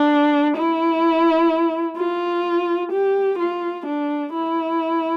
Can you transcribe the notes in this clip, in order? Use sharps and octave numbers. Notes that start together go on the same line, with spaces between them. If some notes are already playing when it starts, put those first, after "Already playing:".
Already playing: D4
E4
F4
G4
F4
D4
E4